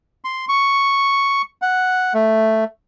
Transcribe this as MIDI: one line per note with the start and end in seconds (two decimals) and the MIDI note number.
0.24 0.45 84
0.49 1.42 85
1.62 2.13 78
2.14 2.64 57